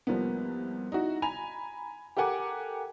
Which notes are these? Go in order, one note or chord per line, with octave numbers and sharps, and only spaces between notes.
C2 F3 A#3 B3
D#4 E4 F#4
G#5 A#5 B5 F7
G4 A4 A#4 F#5 G#5 D6